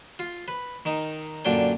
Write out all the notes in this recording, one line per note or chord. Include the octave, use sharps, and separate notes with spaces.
F4
B4
D#3 D#4
F#2 A#2 D3 D4 G5